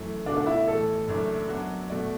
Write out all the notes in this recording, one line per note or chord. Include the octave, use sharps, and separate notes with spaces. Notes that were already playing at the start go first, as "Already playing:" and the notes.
Already playing: F#2 E3 A3
B2 A3 D4 F#4 D5
D4
E4
E4
A1 A2 E3 A4
F#1 F#2 E3 A3 D4
F#2 F#3 B3 D4 F#4
B2 A3 F#4 D5